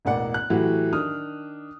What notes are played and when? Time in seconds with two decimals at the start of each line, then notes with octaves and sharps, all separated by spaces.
0.05 E1 A1 A#3 D5 F#5
0.34 F#6
0.50 A2 E3 F#3 F#4 G4
0.93 D#3 D4 D#6 F6